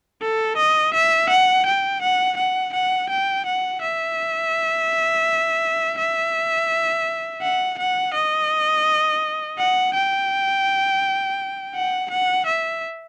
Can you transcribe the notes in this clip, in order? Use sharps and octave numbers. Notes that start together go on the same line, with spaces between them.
A4
D#5
E5
F#5
G5
F#5
F#5
F#5
G5
F#5
E5
E5
F#5
F#5
D#5
F#5
G5
F#5
F#5
E5